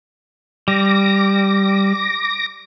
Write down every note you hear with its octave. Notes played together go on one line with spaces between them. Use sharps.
G3 D6 A#6